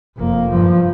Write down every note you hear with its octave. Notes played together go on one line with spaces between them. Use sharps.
F1 A#3
G2 F3